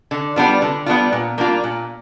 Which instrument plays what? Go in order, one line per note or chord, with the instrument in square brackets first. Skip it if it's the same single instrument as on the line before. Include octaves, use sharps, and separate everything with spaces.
[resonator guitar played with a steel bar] D3
G3 B3 D4 F4
D3
G3 B3 D4 F4
A#2
G3 A#3 D4 F4
A#2